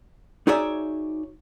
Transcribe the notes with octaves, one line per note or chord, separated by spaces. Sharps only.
D#4 F#4 G#4 C#5 D5 E5